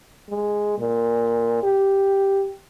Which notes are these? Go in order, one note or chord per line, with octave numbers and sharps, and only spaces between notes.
G#3
A#2
G4